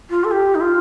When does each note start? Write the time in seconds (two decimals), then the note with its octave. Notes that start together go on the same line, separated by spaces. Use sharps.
0.10 F4
0.24 A4
0.31 G4
0.55 D#4
0.61 F4